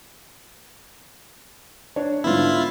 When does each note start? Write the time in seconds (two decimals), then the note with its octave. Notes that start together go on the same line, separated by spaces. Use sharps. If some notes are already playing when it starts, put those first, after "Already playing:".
1.96 D4 C#5
2.24 G#2 D3 B3 E4 F4